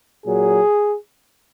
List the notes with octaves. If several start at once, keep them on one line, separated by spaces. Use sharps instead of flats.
A#2 F#3 G#4